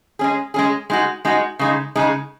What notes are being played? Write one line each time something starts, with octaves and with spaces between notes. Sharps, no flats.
G#3 C#4 G#4
G#3 C#4 G#4
G#3 D#4 F#4
G#3 D#4 F#4
C#3 G#3 D#4
C#3 G#3 D#4